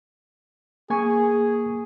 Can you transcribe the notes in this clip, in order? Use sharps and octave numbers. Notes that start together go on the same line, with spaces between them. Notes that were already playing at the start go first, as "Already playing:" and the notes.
A#3 G#4 G#5 C#6